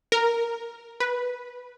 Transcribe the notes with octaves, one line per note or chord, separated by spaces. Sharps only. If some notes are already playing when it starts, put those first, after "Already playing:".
A#4
B4